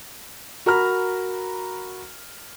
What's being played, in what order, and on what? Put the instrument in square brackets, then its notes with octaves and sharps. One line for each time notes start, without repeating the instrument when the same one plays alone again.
[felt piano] F#4 A#4 A#5 B5 F6